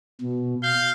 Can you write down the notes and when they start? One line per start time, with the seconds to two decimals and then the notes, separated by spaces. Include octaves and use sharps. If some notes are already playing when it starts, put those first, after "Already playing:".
0.21 B2
0.63 F5 G6